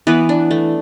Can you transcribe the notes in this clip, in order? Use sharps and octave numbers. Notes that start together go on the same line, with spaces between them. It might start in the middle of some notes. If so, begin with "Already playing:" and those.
E3 B3 B4
D4
A3